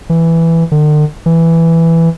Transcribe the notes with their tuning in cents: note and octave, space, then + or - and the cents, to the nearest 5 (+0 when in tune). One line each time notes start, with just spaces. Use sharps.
E3 +5
D3 +45
E3 +5